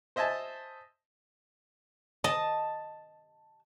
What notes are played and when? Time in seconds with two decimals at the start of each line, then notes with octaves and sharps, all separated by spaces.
0.16 C5 D#5 E5 G#5 A5
2.24 D#5 A5